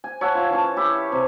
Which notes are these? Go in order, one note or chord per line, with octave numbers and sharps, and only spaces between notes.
G#5
C#5 E5 F#5 A5
F4
E3 C#4 A5
E4 G4
C3